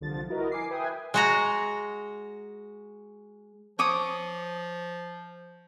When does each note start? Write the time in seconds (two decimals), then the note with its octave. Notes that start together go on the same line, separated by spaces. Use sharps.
0.01 C2 D3 F3 A6
0.29 E4 F#4 A#4 B4 D#5
0.51 G#5 D6 C7
0.70 B4 E5 G5 G#5 D#6
1.14 G#3 F#4 A#5
3.79 F3 C#5 D6 D#6